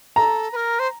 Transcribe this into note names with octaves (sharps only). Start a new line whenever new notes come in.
A4 A#5
B4
A#4
C5